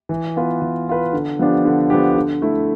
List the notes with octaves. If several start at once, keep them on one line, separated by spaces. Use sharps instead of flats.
E3
B3 F4 B4
E3
B3 F4 B4
D3
F3 B3 D4 G4
D3
F3 B3 D4 G4
D3
A3 E4